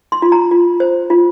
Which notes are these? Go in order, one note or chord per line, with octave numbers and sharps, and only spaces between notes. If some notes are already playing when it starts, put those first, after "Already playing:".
C6
F4
A#5
F4
C5
F4